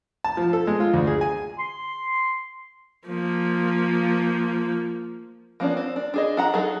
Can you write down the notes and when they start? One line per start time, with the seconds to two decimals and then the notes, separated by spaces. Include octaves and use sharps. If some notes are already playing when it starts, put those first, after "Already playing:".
0.24 A5
0.37 F3
0.53 A4
0.67 G#3
0.80 F4
0.94 D2
1.07 G#4
1.21 G#5
1.59 C6
3.07 F3 A#3
5.60 F3 A#3 B3 C#4 D4
5.77 C4
5.96 D4
6.14 D4 G#4 D#5
6.37 D4 F#5 A#5
6.54 F#3 D#4 G#4 A4